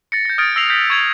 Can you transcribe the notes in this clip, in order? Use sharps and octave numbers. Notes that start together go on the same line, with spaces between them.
A6 A#6 C#7
G6 A#6
D#6 F6 G#6 A6 D7
E6 A#6 C7 F7
G6 A#6 B6
C#6 G#6 F7